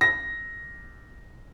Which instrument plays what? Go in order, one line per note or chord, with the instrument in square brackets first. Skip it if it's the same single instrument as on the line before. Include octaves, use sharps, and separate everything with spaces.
[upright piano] A#6